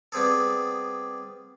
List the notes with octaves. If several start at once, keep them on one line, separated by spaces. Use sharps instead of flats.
G3 B3 C4 G#4 A4